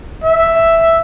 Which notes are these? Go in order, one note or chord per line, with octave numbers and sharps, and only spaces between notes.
E5